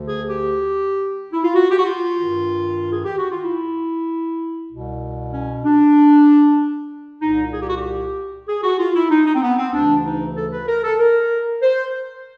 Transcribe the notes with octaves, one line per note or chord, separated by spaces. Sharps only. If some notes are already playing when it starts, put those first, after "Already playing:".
Already playing: D2 D3
G#4
G4
E4
F4
F#4
G4
F#4
F4
G2 D#3
G#4
G4
F#4
F4
E4
C2 B2
C#4
D4
C2 A#2 D#4
G#4
G4
F#4
G4
G#4
F#4
F4
E4
D#4
D#4
C4
B3
C4
D2 C#3 E3 D4
D#4
A4
B4
A#4
A4
A#4
C5